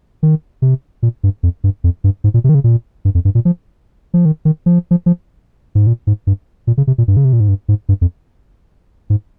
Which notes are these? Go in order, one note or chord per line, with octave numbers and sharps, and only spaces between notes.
D#3
C3
A#2
G2
F2
G2
F2
G2
G#2
A#2
C3
D#3
C#3
A#2
G2
F2
G2
A#2
F3
F3
D#3
D#3
F3
F3
F3
G#2
A#2
G#2
G2
A#2
C#3
C3
A#2
G2
C#3
C3
A#2
G#2
G2
G#2
G2
F2
G#2